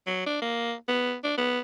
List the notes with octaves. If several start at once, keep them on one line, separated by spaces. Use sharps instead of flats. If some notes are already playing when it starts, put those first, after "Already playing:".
F#3
D4
A#3
B3
D4
B3